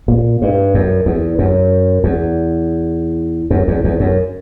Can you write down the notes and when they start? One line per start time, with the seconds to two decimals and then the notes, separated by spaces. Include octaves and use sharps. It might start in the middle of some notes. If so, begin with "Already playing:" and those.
0.08 A#2
0.42 G2
0.74 F#2
1.06 E2
1.39 F#2
2.04 E2
3.50 F#2
3.68 E2
3.84 E2
4.00 F#2